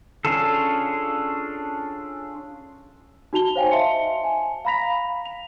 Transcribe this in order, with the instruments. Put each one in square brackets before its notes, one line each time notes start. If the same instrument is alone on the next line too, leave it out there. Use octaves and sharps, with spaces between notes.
[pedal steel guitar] C#4 D4 F4 G#4 A4
[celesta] D#4 F#4 A5 F7 G7
C5 C#5 F5 G5 G#5
D#5 E5 A5 C6 C#7
G#5
F5 A#5 B5 A#6 B6 F7
F7